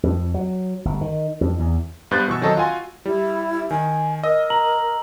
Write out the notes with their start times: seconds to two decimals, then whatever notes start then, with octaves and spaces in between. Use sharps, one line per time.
0.03 F2
0.34 F#3
0.85 G1
1.01 D#3
1.41 F2
1.59 E2
2.11 G2 B3 C5 F#6 G6 A6
2.28 B2 E3 C#6 E6
2.41 D#3 F#3 C4 A4 D#5
2.57 F4 F#4 G#5 C6
3.05 G3 E4
3.71 D#3 G#5
4.23 A#4 D#5 E6
4.50 A#5 F#7